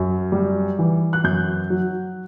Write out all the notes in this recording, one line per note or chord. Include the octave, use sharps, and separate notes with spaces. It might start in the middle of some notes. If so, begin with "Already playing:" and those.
Already playing: F#2
G3
E3
F#6
F#2 G6
F#3